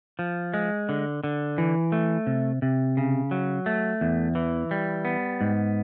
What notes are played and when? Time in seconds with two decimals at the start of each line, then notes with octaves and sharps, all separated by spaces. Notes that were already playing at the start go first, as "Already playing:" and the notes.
0.19 F3
0.54 G#3
0.89 D3
1.24 D3
1.58 E3
1.92 A3
2.27 C3
2.62 C3
2.97 C#3
3.31 F#3
3.66 A3
4.01 E2
4.35 E3
4.71 G3
5.05 B3
5.41 G#2